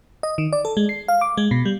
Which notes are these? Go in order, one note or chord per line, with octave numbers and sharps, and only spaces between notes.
D#5
D#3
D5
A4
G#3
C7
F5
D6
G#3
B2
G3